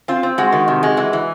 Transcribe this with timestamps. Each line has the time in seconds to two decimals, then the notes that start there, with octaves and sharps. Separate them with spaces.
0.08 C4 F4
0.23 C4
0.38 G#3 F#4
0.52 D#3
0.68 C3
0.83 G#3
0.97 E3
1.13 E3